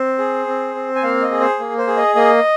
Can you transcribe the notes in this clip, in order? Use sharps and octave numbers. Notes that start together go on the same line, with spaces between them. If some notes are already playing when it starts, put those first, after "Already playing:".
Already playing: C4 C5
G#4
C4
C4
G#5
A#3 F5
D#5
G#4
C5
A#3
C5
G#4
D#5
A#3 D#5